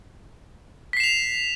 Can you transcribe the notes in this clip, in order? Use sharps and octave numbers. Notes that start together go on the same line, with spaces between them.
B6 C7 E7 F7